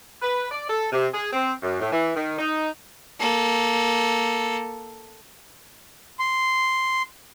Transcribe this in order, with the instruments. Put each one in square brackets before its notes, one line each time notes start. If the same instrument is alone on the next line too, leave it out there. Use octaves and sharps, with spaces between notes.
[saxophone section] B4
D5
A4
C3
G#4
C4
F#2
A2
E3
D#3
D#4
[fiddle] A#3 A4
[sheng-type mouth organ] C6